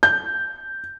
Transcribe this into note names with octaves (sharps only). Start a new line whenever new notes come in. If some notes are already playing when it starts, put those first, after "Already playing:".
G6